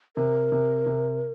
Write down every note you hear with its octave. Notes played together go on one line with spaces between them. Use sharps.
C3 A#4
C3
C3